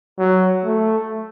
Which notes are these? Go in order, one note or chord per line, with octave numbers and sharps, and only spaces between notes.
F#3
A3